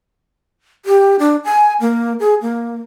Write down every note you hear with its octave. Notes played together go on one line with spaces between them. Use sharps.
G4
D4
G#5
A#3
G#4
A#3